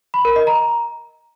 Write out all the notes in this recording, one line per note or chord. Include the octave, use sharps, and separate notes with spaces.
B5
A#4
D#5
A#5